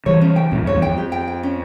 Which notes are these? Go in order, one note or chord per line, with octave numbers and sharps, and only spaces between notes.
E3 G3 C#5
C#4
G5
G2 A#2 C#4
F2 G#2
C#5
E2 G2
F2 G5
G4
G5
G5
C#4